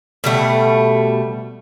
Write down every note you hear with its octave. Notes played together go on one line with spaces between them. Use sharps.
B2 G3 A3